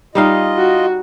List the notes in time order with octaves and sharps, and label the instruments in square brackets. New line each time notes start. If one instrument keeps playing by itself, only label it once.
[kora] G3 D#4 F5 [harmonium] F4 D#5
[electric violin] F#4